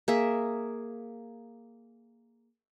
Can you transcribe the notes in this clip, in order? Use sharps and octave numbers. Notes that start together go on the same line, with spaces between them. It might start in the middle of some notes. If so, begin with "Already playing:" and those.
A#3 G#4 E5